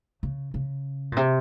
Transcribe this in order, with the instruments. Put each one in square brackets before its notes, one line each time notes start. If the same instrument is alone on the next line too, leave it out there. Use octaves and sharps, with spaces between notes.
[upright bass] C#3
C#3
A#2
C3